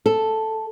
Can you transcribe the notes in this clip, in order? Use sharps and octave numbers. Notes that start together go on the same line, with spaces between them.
A4